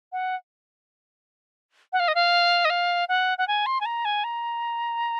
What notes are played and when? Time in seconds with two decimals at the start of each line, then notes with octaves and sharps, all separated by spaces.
0.12 F#5
1.93 F#5
2.00 F5
2.08 D#5
2.15 F5
2.65 D#5
2.70 F5
3.09 F#5
3.38 F#5
3.48 G#5
3.66 C6
3.81 G#5
3.85 A#5
4.05 G#5
4.24 A#5